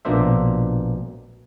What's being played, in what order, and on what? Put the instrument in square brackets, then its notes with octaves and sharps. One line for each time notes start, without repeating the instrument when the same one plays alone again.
[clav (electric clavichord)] A#1 B2 A#3 D4 C5 E5